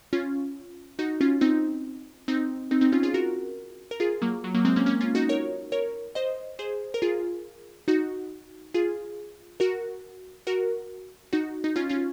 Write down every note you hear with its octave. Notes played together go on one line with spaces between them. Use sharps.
C#4 F4
D#4 F#4
C#4 F4
C4 D#4
C4 D#4
C4 D#4
C4 D#4
C#4 F4
F4 G#4
F#4 A#4
A#4
F4 G#4
F#3 A#3
F#3
F#3 A#3
G#3 C4
A#3 C#4
A#3 C#4
C#4 F4
D#4 F#4
A#4 C#5
A#4 C#5
C5 D#5
G#4 C5
A#4
F4 G#4
D#4 F#4
F4 G#4
F#4 A#4
F#4 A#4
D#4 F#4
D#4
C#4 F4
C#4 F4